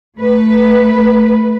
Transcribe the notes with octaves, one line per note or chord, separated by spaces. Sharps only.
A3 B4